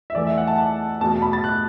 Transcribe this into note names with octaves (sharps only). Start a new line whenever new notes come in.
E5
E2 E3 A3 D5
E5
F#5
A5
A5
E2 B2 A3 A5
A5
B5
A6
F#6